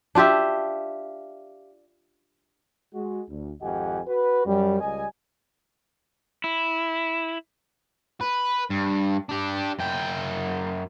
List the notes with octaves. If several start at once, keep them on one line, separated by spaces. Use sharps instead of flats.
D4 F4 G4 E5
G#3 F#4
D2
G#1 F2 G4 D#5 F#5 G#5
F#4 B4
F#2 G3
C#2 G3 D#5 G#5
E4
B4
G2
D4 G4
F#2 G5